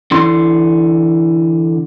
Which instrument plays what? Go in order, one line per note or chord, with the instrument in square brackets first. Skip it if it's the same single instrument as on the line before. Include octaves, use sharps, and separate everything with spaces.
[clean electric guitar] D3 E3 C6